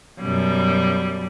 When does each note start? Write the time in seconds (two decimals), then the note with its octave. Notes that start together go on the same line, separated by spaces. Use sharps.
0.20 F#2 B2 G3